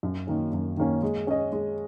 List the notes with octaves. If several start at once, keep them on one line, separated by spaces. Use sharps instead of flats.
F#2
D#3 A#3 C#4
F#2
D#3 A#3 C#4
G#3
C#4 G#4 D#5
G#3